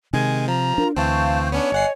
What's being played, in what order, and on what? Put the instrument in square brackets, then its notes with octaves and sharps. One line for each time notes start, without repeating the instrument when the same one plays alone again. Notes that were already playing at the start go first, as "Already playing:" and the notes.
[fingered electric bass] C3 [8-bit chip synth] D#3 G#3 [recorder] G#5
[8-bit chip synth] F3 [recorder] A#5
[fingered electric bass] D4 [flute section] F4 A#4
[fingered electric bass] D2 [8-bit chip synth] E3 C4 [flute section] F5 C#6 G6 [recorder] A5
[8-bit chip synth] B3 C#4 D4 [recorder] C#5
[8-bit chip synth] G1 F#5 C7 [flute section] D#5 G#5